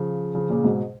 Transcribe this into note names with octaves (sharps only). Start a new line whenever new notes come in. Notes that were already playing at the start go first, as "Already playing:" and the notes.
Already playing: C#3 F3
C#3 F3
A#2 C#3
G#2 B2